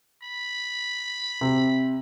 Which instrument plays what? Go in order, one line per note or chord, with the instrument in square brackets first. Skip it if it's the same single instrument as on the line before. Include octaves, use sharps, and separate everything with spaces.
[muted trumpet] B5
[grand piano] C3